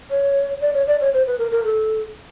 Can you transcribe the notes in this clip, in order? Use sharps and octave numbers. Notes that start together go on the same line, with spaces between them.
C#5
D5
C#5
D5
C#5
C5
B4
A#4
A#4
A4